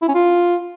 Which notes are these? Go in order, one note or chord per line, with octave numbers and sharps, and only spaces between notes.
E4
C#4
F4